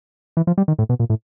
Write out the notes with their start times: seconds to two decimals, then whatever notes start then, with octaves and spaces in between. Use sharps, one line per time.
0.37 E3
0.47 F3
0.58 G3
0.68 D#3
0.79 A2
0.89 B2
1.00 A#2
1.10 A2